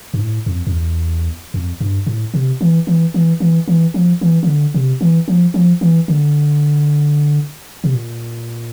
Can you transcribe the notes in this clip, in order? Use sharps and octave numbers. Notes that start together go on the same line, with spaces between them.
G2
A2
F2
F2
E2
F2
G2
A2
C3
E3
E3
E3
E3
E3
F3
E3
E3
D3
C3
E3
F3
F3
E3
D3
C3
A#2